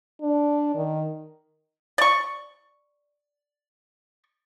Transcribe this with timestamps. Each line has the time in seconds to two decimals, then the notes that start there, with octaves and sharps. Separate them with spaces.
0.21 D4
0.75 D#3
1.98 D5 C#6